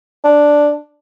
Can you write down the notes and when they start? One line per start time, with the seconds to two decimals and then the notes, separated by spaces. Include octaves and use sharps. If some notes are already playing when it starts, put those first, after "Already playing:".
0.24 D4